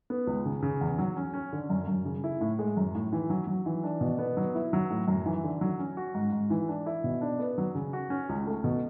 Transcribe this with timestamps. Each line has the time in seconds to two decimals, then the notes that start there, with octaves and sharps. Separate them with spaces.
0.10 B3
0.27 C#2
0.45 C#3
0.62 C#3
0.81 E2
0.98 F#3
1.17 C#4
1.34 C#4
1.53 D3
1.70 F#2
1.88 F#2
2.05 C#3
2.24 E4
2.41 A2
2.59 G#3
2.77 F#2
2.95 A2
3.13 E3
3.30 F#3
3.47 F#3
3.66 E3
3.84 D4
4.01 B2
4.19 B3
4.37 F#3
4.55 E4
4.73 F#3
4.90 A2
5.08 F#2
5.26 E3
5.44 D3
5.61 F#3
5.79 C#4
5.97 F#4
6.15 G#2
6.32 G#2
6.50 E3
6.68 D4
6.86 E4
7.04 B2
7.21 D4
7.39 B3
7.58 F#3
7.75 C#3
7.93 F#4
8.10 C#4
8.29 C#2
8.46 A3
8.64 B2